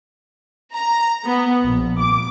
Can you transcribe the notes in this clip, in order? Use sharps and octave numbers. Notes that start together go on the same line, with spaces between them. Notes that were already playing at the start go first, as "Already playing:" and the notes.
A#5
B3
A#1
D6